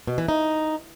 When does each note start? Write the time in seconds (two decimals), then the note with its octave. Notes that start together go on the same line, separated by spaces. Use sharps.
0.07 B2
0.18 E3
0.28 D#4